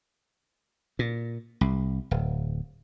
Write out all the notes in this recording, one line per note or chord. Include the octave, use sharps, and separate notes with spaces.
A#2
C2
D1